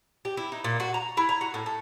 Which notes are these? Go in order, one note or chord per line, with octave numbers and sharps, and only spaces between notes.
G4
E4
D#4
A#2
F#4
A#5
E4
A#5
F#4
A2
A4